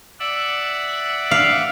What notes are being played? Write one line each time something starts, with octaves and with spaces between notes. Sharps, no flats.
D5 E5 F#5
F5